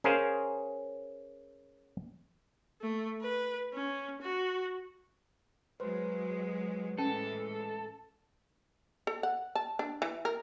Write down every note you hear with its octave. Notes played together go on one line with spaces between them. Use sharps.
C#4 G#4 A#4 C5 F5
A3
B4
C#4
F#4
F#3 G#3 B4 C5 C6
A2 E3 G#3 C#4 A4
A4
F#5
A5
D4
E3
A#4